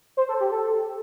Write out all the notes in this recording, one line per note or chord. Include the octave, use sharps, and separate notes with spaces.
C5
A4
G4
A4